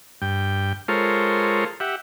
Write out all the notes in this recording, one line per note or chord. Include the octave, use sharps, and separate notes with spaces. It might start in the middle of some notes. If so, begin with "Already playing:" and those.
G2 G5
G#3 F4 A4 A#4 C5 C#5
G4 E5 F#5